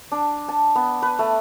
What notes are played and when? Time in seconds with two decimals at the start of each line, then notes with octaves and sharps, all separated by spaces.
0.12 D4
0.48 A5
0.75 B3
1.02 B4
1.19 A3